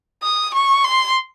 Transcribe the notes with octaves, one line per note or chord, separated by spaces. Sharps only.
D#6
C#6
C6